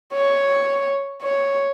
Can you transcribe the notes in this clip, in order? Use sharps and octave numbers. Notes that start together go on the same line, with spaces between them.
C#5
C#5